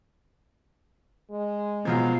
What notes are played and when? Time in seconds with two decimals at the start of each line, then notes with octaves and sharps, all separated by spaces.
1.31 G#3
1.85 B2 F3 F#3 F4 F5